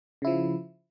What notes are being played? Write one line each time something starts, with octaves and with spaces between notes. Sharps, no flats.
C#3 F3 E4